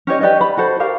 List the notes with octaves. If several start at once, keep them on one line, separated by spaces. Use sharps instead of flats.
C#4 G4 C#5 D#5
G4 B4 D5 D#5
B5
F#4 A4 C5
G4 A#4 F5